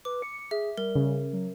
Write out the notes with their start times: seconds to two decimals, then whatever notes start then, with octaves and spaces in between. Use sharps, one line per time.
0.05 B4 D6
0.22 C#7
0.51 G#4 E5
0.78 G3 A#4
0.96 C#3
1.33 F#3